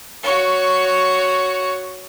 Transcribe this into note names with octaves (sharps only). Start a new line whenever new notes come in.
F#4 C#5